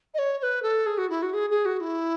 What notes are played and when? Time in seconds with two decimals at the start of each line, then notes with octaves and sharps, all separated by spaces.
0.14 D#5
0.18 C#5
0.38 C#5
0.42 B4
0.62 A4
0.86 G#4
0.97 F#4
1.09 E4
1.22 F#4
1.33 G#4
1.50 G#4
1.65 F#4
1.80 E4